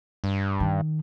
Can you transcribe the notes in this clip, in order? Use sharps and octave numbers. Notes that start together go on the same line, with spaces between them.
G2
D#3